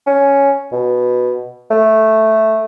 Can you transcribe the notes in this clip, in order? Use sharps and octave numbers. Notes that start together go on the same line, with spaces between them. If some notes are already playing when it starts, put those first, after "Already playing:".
C#4
B2
A3